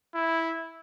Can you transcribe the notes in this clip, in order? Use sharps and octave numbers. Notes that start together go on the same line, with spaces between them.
E4